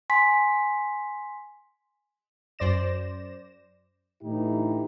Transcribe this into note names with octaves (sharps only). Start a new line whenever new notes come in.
G#5 C6 B6
F#2 C5 D5 A#6 E7
A2 D3 E3 D#4 G4